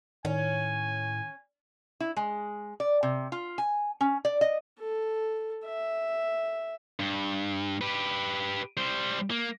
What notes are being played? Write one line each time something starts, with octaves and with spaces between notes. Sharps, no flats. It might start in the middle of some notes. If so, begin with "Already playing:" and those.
A2 D#3 C#4 G#5
E4
G#3
D5
C3
F4
G#5
C#4
D5
D#5
A4
E5
G2
G4 B4
G3 C5
A#3